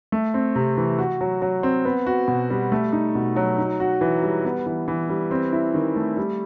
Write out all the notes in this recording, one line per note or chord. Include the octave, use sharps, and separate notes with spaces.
A3
C4
C3
E3
F#4
F#3
F#3
C4
B3
F#4
B2
G3
A3
D#4
B2
F#3
D#4
F#4
E3
G3
B3
E3
E3
G3
C4
E4
D#3
A3
G3